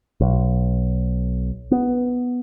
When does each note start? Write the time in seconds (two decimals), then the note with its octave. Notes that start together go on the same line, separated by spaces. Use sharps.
0.21 B1
1.71 B3